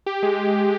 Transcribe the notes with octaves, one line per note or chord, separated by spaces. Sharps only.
G4
G#3